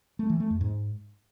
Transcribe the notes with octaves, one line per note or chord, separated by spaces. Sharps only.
A3
E3
A3
F2
G#2